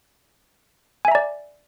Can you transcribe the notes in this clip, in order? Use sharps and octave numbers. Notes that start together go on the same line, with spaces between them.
D5 E5 G#5 A#5